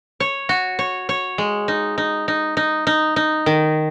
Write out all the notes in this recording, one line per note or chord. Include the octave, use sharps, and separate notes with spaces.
C#5
F#4
C#5
C#5
G#3
D#4
D#4
D#4
D#4
D#4
D#4
D#3